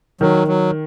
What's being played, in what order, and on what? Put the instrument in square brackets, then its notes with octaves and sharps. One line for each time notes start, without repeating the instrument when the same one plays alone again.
[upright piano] D#3 [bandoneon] F#3
[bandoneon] F#3